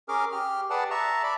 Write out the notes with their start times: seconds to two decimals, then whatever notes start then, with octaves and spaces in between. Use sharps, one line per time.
0.09 C#4 G#4 A#4 D6 F6
0.32 G4 F6
0.70 G4 G#4 B4 D5 F#5 A5
0.91 E5 A5 A#5 C#6
1.23 D5 E5 B5